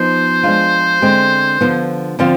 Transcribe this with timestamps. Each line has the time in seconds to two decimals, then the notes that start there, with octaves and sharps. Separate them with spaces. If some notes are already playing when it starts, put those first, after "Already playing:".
Already playing: F3 B3 D#4 C5
0.43 F3 G#3 D4 F4
1.02 D3 G#3 C4
1.61 D3 F3 B3 F4
2.19 D3 F3 C4 F4